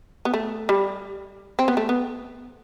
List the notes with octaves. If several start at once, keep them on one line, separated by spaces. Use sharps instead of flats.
B3
A3
G3
C4
B3
A3
B3